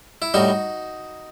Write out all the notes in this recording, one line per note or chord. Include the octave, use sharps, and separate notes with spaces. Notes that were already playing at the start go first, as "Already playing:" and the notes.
E4
A2 G3 D#4 F#4